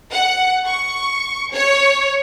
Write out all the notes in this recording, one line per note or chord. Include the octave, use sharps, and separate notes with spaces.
F#5
C#6
C#5